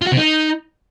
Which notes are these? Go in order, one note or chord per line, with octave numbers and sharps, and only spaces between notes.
F4
F#4
C3
D#4